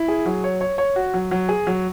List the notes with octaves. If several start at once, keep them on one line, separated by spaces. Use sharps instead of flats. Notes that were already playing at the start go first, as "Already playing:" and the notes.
Already playing: E4
G#4
F#3
C#5
C#5
C#5
F#4
F#3
F#3
G#4
F#3